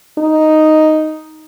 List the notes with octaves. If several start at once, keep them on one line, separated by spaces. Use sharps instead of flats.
D#4